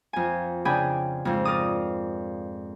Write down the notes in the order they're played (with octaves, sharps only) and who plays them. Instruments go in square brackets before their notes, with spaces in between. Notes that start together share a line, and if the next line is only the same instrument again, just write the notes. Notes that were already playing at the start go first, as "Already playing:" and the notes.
[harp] F2 G#5
C#3 D4 G#4 G5 G#5 B5
F2 G#2
A#4 D5 D#6